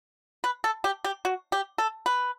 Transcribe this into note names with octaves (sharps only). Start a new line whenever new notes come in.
B4
A4
G4
G4
F#4
G4
A4
B4